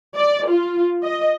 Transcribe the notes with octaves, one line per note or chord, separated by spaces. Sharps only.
D5
F4
D#5